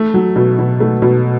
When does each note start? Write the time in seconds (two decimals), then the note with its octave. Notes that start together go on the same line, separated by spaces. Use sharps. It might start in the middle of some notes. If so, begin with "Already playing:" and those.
Already playing: A3
0.14 F#3
0.36 B2
0.59 B2
0.80 A3
1.02 B2